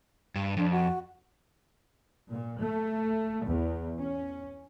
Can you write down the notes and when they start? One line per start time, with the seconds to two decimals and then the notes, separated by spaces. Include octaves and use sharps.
0.35 G2
0.57 F2 D4
0.71 F#4
2.29 A#2
2.61 A3
3.46 E2
3.99 C#4